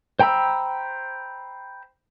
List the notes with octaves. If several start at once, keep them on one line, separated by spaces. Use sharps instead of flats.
C5 G5 A#5 B5 E6